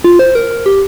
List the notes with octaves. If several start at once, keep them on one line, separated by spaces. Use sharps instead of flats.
F4
C5
A#4
G4